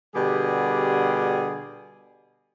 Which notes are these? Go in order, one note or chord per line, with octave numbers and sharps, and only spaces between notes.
B2 D3 G3 G4 G#4